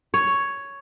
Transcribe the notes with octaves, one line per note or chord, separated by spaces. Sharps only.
C#5